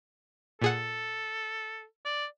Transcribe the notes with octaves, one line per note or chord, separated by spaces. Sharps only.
A#2 G#4 A4 F#5
D5